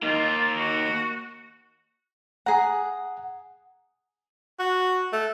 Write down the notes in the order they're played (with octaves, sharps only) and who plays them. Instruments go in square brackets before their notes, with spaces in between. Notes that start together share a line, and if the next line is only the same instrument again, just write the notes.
[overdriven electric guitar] A#3 D#4 [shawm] F4
[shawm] F#4
[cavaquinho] G#4 A#5 [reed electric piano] F#5
[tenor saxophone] F#4
A3